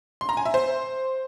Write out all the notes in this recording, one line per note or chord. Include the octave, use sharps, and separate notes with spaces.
C6
A#5
G#5
E5
C5